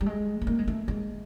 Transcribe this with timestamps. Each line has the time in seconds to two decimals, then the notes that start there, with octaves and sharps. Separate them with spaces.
0.01 G3
0.06 G#3
0.42 A3
0.47 A#3
0.59 G#3
0.68 A3
0.88 G#3